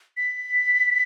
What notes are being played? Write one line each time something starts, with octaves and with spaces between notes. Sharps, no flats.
B6